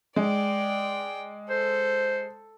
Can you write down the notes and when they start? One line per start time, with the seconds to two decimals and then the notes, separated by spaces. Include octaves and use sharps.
0.16 G#3 D5 G5
1.50 A4 C5